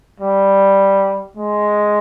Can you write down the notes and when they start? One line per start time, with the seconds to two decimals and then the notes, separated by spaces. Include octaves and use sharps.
0.20 G3
1.37 G#3